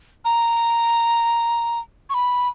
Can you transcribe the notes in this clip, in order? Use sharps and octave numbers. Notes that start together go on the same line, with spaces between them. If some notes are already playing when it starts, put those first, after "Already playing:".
A#5
C#6
B5